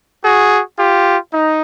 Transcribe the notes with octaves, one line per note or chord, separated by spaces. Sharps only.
F#4 G#4
F4 G4
D#4